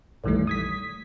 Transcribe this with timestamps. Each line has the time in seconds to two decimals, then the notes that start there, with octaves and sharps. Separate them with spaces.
0.24 A#1 F2 D#3 E3 G3 A3
0.47 D#6 G#6 B6